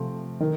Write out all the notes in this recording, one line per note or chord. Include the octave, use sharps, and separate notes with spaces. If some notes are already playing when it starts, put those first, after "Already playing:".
Already playing: C3 F3 A3 C4
D#3